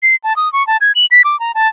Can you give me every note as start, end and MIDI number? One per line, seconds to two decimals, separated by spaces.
0.03 0.16 96
0.24 0.36 81
0.36 0.51 87
0.53 0.65 85
0.67 0.77 81
0.81 0.92 92
0.95 1.06 102
1.11 1.22 95
1.24 1.39 86
1.40 1.52 82
1.55 1.68 81